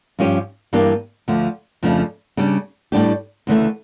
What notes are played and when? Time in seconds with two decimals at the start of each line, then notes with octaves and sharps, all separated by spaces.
0.19 G2 F3 C#4 G4
0.73 G2 E3 A#3 D4 G4
1.28 D2 D3 F3
1.83 F2 C#3 F3 A3 D4
2.37 C#3 G3 D4
2.92 A2 G3 D4 G4
3.47 D2 C#3 E3 A3